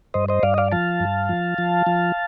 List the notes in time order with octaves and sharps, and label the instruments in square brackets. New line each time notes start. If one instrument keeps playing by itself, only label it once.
[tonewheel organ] G2 C5 D#5
C5 D#5
G2 D5 F5
D#5
D5 F5
F3 F5 A5
G2
F3
F3
F3